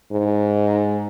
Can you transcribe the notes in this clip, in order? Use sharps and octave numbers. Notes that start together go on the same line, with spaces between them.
G#2